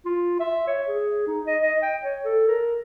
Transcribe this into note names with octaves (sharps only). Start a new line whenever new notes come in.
F4
E5
C#5
G#4
D#4
D#5
D#5
G5
C#5
A4
A#4